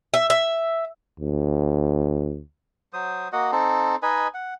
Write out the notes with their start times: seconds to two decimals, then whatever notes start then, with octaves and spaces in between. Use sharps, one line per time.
0.14 E5
0.30 E5
1.20 D2
2.93 F#3 C5 D#6
3.33 A#3 F#4 D#5 F#5
3.52 C4 D#4 A4
4.03 D#4 B4 D#5 G#5
4.34 F#5